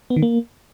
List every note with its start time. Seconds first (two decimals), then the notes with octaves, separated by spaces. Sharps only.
0.10 B3
0.16 D#3
0.22 A#3